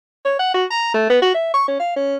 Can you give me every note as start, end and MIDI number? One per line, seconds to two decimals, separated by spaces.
0.25 0.34 73
0.39 0.53 78
0.54 0.65 66
0.70 0.93 82
0.94 1.08 57
1.10 1.21 59
1.22 1.34 66
1.34 1.49 76
1.54 1.64 85
1.68 1.80 61
1.80 1.95 77
1.96 2.17 61